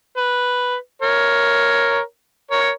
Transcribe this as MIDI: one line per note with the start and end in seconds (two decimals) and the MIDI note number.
0.17 0.75 71
1.02 1.99 70
1.02 1.99 73
2.51 2.70 70
2.51 2.70 73